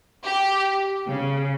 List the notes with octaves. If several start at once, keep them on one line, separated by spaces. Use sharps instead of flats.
G4
C#3